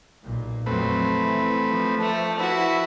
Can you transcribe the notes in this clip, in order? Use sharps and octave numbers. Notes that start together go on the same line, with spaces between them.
B1 A#2
F2 F#3 A3 C4 B4
E3
F3
A3
E4 F#4 B4 E5